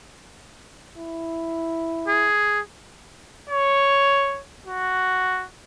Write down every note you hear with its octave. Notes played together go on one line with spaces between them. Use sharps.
E4
G#4
C#5
F#4